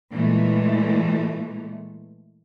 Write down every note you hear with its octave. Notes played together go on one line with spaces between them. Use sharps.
A#2 E3 G#3 A3